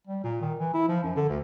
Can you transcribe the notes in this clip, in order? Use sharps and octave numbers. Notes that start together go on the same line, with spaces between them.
G3
A#2
D#3
E3
E4
F3
F#2
D3
D2